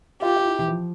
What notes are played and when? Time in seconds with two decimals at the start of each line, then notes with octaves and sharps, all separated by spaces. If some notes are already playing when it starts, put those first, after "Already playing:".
0.22 F4 G4
0.36 F4
0.45 E4
0.59 E3
0.68 F3